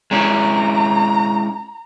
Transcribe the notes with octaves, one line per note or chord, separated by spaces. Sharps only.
G#3 C#4 E4 A#5